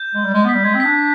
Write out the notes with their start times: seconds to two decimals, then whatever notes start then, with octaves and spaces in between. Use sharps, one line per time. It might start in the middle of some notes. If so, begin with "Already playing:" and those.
Already playing: G6
0.15 G#3
0.25 G3
0.34 G#3
0.44 B3
0.49 B6
0.55 G3
0.64 G#3 G#6
0.74 C4
0.80 D4 B6